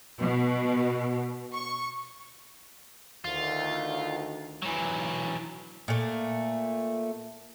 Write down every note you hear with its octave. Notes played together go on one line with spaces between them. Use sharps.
B2
C#6
D2 D#3 F4
E3 F#3
A#2 A3